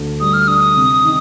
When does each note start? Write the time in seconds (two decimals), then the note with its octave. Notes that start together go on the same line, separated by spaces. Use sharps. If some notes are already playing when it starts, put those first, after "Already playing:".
Already playing: D2 D3
0.20 G3 D#6
0.33 F6
0.48 D4 D#6
0.76 C3
1.05 D#3